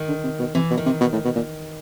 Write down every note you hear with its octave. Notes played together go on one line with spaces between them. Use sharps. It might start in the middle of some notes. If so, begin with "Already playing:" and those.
Already playing: D#3
D3
C3
B2
C3 E3
B2
D#3
C3
B2
A2
B2
A#2